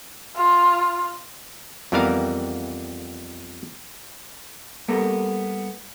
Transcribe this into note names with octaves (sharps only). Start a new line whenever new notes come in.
F4
F2 E3 G3 B3 A#4 F5
G3 A#3 B3 A4 A#4